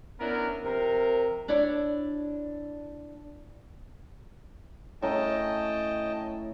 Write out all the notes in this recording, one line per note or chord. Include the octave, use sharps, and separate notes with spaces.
B3 C#4 D4 E4 A#4
C3 F3 A#4
D4 E4 C#5 D5
A2 C#4 D#5 G5 A5 A#5